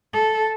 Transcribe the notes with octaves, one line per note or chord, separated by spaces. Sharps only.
A4